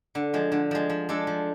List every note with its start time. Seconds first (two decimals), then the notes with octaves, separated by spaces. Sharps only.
0.15 D3
0.34 F3 G#3
0.52 D3
0.71 F3 G#3
0.89 F3
1.09 G#3 D4 A4
1.27 F3